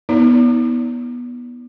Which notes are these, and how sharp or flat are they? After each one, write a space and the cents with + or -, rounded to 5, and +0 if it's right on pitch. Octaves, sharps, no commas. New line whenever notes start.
B3 -15 D#4 +45 D5 -40